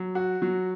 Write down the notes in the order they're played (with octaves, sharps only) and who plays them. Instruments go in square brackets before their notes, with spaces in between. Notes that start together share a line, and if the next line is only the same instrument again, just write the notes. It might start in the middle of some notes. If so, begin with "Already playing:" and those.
Already playing: [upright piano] F#3
F#4
F#3